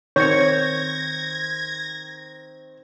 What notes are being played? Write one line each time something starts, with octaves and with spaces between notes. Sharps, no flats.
D#3 C4 C#5 G6 G#6 A#6 C#7